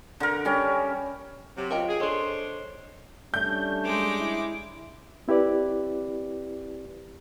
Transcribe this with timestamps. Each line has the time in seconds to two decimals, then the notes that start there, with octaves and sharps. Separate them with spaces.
0.20 D3 A#4
0.45 G3 C#4
1.56 C3 F#3
1.71 F4 A#4 D#5 F5 G5 A#5
1.88 G#4
2.00 D4 G#4 A4 C5 C#5 D#5 C6
3.34 G3 A3 C#4 D4 G6
3.84 G#3 D6
4.20 E4
5.28 C4 E4 G4 B4 D5